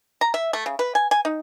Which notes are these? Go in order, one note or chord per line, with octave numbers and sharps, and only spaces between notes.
A#5
E5
A3
C#3
B4
G#5
G#5
D#4